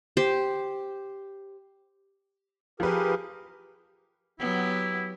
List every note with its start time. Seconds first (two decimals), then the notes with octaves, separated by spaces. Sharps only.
0.17 G4 C5
2.80 F3 G4 G#4 A#4 B4
4.39 F#3 B3 E4 G4